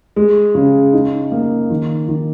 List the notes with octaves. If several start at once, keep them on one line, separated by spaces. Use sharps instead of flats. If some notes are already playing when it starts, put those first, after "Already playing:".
G#3
C#3
D#4
A#3
D#3
D#3